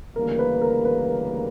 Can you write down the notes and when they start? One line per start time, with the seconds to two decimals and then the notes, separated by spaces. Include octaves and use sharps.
0.15 D2 C#3 E3 G3 A#3 A#4
0.39 B4
0.62 A#4
0.85 B4